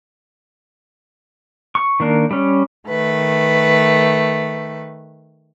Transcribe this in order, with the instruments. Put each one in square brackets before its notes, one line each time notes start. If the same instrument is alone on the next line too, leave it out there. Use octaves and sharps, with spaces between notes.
[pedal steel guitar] C#6
D#3 A#3 D4
G3 C#4
[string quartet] D#3 A3 B4